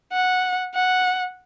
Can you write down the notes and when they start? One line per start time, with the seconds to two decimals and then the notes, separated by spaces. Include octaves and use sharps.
0.13 F#5
0.75 F#5